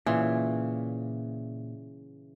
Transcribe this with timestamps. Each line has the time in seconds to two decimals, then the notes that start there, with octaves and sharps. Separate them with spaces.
0.06 A#2 C#3 E3